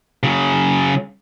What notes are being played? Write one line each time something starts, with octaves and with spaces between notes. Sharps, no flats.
C#3 F#3